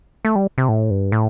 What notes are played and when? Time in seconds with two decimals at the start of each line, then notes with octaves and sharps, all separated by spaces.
0.25 A3
0.36 G3
0.58 C3
0.69 A2
0.91 G2
1.12 A2